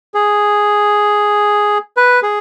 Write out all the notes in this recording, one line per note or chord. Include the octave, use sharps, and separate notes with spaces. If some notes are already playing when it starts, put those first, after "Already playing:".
G#4
B4
G#4